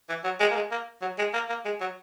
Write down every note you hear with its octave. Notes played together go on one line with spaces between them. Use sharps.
E3
F#3
G#3
A#3
G#3
A#3
F#3
G#3
A#3
A#3
G#3
F#3